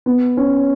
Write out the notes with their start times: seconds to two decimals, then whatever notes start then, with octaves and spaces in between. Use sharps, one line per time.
0.06 B3
0.37 C#4